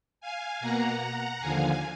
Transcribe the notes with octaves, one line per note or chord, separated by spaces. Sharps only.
F5 G#5
B2 A#3 F#5 A#5
D#2 D3 F3 F5 G#5